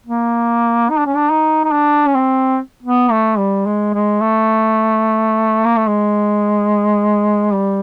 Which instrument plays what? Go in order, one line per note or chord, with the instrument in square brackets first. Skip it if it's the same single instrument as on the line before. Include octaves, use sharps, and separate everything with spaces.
[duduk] A#3
D#4
D4
C#4
D4
D#4
D#4
D4
C#4
C4
B3
A3
G3
G#3
G#3
A3
A#3
A3
G#3
G3